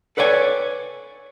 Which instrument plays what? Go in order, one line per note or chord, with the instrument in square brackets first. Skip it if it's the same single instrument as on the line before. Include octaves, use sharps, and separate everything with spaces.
[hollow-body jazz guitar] A4 B4 C#5 D5 G5 G#5